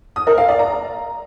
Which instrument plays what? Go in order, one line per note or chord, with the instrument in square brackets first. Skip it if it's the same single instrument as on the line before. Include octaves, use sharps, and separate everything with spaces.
[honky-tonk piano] D#6
A#4
F5
D5
A#5